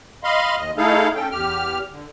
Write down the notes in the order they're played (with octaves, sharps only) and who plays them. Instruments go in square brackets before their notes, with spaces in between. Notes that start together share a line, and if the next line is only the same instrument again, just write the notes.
[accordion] D#5 F5 B5 C6
D#2 D#5
A3 D#4 E4 G#4 A4 F5
C#4 A4 G5
E2 G4 F6
D3